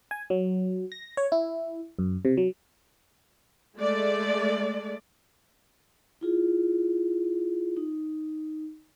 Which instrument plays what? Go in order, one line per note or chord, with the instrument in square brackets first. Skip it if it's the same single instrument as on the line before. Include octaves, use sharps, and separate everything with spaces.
[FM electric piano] G#5
F#3
A#6
C#5
E4
F#2
C3
F#3
[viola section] G#3 A3 D5
[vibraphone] E4 F4 G#4
D#4